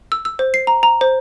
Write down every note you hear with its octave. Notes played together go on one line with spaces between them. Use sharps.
E6
E6
C5
C7
A#5
A#5
C5